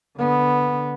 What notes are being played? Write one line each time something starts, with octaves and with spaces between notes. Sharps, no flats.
D3 B3